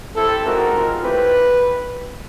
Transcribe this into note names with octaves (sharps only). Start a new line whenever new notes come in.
C4 E4 G4 A4
G#3 C4 D#4 F#4 A#4
G#3 C4 F4
A3 C4 E4 G4 B4